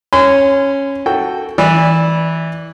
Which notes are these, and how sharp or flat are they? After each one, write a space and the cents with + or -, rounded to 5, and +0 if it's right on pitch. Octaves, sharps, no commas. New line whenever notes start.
C#4 -10 C6 -35
F#4 +5 A4 +0 G5 +0
E3 -15 E4 -15 D5 +0